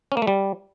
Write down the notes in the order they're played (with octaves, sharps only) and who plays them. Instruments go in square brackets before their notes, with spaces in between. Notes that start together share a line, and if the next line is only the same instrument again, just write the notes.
[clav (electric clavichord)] C#4
A#3
A3
G3